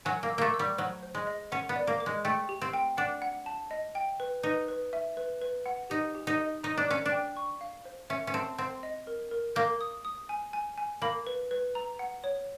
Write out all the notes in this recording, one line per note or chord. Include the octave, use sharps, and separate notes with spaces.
F#3 G#5
A#3
E6
A3 A#3
E6
G3
F#3 C5
C5
G#3
D#5
C#4 F#5
B3
D5
A#3
D6
G#3
A3 G5
G4
C4
G5
D4 F#5
F#5
A5
D#5
G5
B4
D#4 B4
B4
E5
B4
B4
F#5
D#4 G4
G4
D#4
D#5
D#4 A#5
D4
C#4 D5
D4
G5
C#6
F5
C5
C#4 E5
C#4
C4 A5
C4 C5
D#5
A#4
A#4
A#3 G6
D#6
D#6
G#5
G#5
G#5
A#3 B5
B4
B4
A#5
F#5
C#5